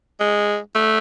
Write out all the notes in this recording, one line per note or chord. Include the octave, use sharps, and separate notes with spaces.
G#3
A3